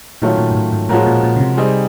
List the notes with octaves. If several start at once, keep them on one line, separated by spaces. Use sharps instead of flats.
A#2 D#3 F#3 A3 C#4 F4
A#2
G#2
A2
G#2
A2 F3 G#3 C#4 F#4 A#4
A#2
A#2
C#3
C3
G3 C4 D#4 G#4